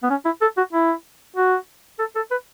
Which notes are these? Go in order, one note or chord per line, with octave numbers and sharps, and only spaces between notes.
B3
C#4
E4
A4
F#4
E4
F#4
A4
A4
B4